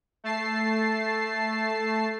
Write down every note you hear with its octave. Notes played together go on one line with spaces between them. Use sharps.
A3 A5 C7